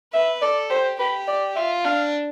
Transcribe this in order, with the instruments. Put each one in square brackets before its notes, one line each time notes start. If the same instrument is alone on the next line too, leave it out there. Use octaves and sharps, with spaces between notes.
[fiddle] B4 [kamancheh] E5
[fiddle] A4 [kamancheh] D5
[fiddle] G4 [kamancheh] C5
[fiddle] G4 [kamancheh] B4
[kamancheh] D5
[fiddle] F4 [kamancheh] E5
[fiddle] D4 [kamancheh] F5